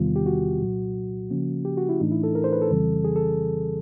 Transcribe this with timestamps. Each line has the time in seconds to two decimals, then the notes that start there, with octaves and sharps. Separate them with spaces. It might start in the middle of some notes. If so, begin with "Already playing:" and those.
Already playing: E2 C3 D#3 G3 B3 F4
0.16 G4
0.26 F#4
0.61 C2 A#2 F#3
1.30 C#3 F3 A#3 C#4
1.65 G4
1.77 F#4
1.89 E4
2.00 A2 E3 A3 D4 D#4
2.12 E4
2.23 A4
2.35 A#4
2.44 C5
2.53 B4
2.62 A4
2.70 F2 C#3 E3 G3 C4
3.05 G#4
3.16 A4